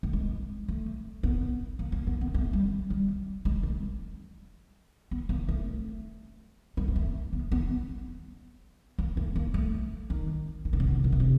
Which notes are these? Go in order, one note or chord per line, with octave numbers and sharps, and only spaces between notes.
A3
G#3
A3
B3
A#3
A#3
B3
B3
A3
G3
G3
G#3
A3
B3
A#3
A3
G#3
A#3
A3
B3
B3
A#3
A3
A#3
A3
D#3
D#3
D3
C#3
D3
A#2
B2
C3